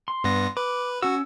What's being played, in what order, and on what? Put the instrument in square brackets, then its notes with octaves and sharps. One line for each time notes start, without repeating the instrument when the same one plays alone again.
[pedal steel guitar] C6
[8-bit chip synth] G2 B3 A#6
[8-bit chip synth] B4 [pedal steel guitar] D6
[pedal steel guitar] C#4 E6 [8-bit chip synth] F#4